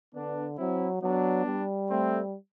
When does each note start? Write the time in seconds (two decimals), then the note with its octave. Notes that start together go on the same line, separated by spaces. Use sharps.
0.15 D3 B3 D4
0.58 F#3 C4 E4
1.02 F#3 B3 D4
1.46 G3
1.89 A3 C4